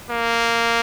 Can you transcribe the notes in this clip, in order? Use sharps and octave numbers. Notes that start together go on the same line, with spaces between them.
A#3